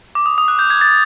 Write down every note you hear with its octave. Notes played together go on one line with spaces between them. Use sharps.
D6
D#6
D#6
F#6
G6
G#6
A6